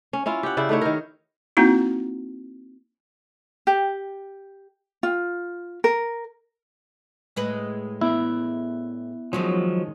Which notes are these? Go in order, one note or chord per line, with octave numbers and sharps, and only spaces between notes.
C#4
C#4 E4 F4
G4 F#5
C#3 E4 D5
A3 D#4 E4 C#5
D#3 A#4
A#3 C4 D#4 E4 F#4
G4
F4
A#4
A2 G#3 B4
B3 E4 D5 E5
D#3 F3 F#3 G#3 C#4